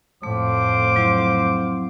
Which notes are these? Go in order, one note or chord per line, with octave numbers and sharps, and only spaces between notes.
F2 A2 A3 C5 F5 D6
F#3 C4 E4